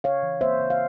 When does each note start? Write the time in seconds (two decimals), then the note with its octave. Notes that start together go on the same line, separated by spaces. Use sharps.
0.04 C#3 C#5 F5
0.23 E3
0.41 A#3 C5 E5
0.60 C#3
0.70 F5